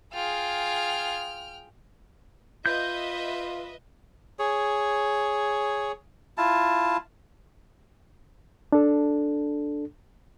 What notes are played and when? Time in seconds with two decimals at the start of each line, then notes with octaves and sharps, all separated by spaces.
0.14 F4 G#4 G5 F6
2.66 F4 B4 D#5 E5 G6
4.39 G#4 C#5
6.38 E4 F4 A5
8.72 D4 A4